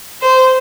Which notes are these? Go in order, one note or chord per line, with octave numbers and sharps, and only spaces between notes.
C5